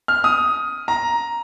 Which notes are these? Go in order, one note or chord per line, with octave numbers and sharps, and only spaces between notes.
F6
D#6
A#5